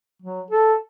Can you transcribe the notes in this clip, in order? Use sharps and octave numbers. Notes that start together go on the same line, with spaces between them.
F#3
A4